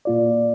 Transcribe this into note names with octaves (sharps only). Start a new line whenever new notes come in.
A#2 A#3 F4 D5